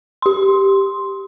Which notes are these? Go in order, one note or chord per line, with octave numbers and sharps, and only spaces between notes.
G4 C6